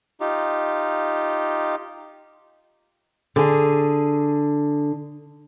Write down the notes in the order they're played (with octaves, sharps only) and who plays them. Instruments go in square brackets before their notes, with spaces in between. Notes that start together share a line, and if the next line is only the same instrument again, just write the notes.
[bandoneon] D#4 F4 G4
[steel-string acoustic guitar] D3 G#4